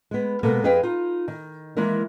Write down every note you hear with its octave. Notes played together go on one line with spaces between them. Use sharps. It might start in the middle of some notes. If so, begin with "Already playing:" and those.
G#3 B3
B2 G#3 A#3 B3 A4 A#4
F2 G#4 B4 D#5 F5 G5
D#4 F4
D#3
D#3 E3 G#3 A#3 E4 A#4